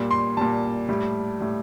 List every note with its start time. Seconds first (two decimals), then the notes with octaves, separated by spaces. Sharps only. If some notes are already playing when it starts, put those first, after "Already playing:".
Already playing: A#2 G3
0.11 C6
0.37 A#2 G3 A5
0.89 A2 G3
1.40 A2 G3